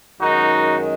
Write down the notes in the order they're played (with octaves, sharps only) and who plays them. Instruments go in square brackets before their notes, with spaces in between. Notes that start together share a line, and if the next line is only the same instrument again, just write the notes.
[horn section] F#2 D#3 G#3 D#4 F#4